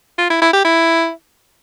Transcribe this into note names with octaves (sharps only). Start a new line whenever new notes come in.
F4
E4
E4
G4
E4